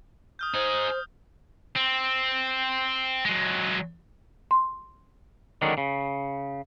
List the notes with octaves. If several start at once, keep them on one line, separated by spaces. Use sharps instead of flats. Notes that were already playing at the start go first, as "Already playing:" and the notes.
D#6 F6 G6
D#4 G#4 C5
C4
F#3 G#3
C6
D3 D#3 F#3 G#3 C#4 D4
C#3